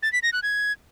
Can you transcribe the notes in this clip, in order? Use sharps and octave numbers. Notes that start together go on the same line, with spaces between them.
A6
B6
A#6
F#6
G#6